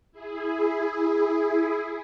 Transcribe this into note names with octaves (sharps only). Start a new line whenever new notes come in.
E4 G#4